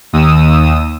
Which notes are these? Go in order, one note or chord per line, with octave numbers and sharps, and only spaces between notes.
D#2 D#6 E6